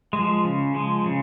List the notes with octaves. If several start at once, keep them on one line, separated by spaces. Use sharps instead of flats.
G#3
F3
C#3
F3 G#3
C#3